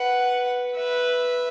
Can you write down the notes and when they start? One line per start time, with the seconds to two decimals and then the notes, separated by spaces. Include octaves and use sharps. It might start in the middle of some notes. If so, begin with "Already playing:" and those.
Already playing: B4 F#5
0.77 B4 E5